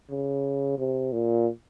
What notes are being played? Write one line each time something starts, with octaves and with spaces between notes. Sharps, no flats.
C#3
C3
A#2